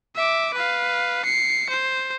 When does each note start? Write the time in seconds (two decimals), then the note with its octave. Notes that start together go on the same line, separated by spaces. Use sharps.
0.15 E5 D6
0.54 B4 F5
1.25 C7 C#7
1.69 C5